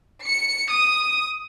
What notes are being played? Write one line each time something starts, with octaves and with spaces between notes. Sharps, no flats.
C#7
D#6